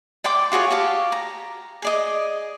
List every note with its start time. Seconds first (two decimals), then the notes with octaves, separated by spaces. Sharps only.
0.24 D5 G5 C6 D6
0.52 F4 F#4 G#4 C#5
0.71 G4 F5 A5
1.12 A#5
1.82 G#4 D5 D#5